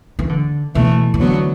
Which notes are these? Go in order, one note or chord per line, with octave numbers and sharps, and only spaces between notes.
E3
D3
B2 E3 A3
E3
D3 F#3 B3